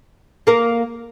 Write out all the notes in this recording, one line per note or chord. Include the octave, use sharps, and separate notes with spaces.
A#3 A#4